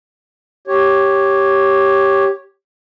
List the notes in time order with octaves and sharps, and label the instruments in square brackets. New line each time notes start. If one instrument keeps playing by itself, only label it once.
[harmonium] G4 C#5